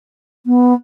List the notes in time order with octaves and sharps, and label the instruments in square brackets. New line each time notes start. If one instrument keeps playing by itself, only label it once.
[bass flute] B3